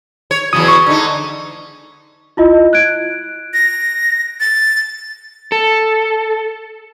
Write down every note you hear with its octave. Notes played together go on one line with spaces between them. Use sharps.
C#5
E2 C#3 F#3 D#6
C#6
D3 G#3 D#4
E4 F4 D#5
F#6 G#6 D7
A#6
A6
A4